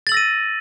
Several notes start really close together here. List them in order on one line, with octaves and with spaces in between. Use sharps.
A6 F#7 E6 A#6 D#7